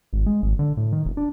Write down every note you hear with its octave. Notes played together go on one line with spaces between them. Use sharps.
G#1
G#3
G#1
D3
A2
D#3
E1
D4